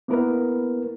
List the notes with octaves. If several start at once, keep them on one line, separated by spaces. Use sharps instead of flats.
A#3 B3 E4 A#4 B4